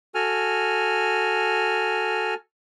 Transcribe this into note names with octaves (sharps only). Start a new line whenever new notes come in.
F#4 A4 G#5 F6